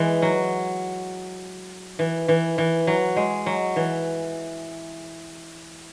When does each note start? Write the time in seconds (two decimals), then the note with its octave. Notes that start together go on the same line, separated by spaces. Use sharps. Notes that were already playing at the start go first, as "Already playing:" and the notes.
Already playing: E3 G#3
0.22 F#3
1.99 E3
2.28 E3
2.58 E3
2.87 F#3
3.16 G#3
3.46 F#3
3.76 E3